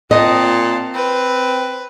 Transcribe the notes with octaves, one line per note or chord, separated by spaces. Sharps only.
A#2 C4 D#5 A5
C4 B4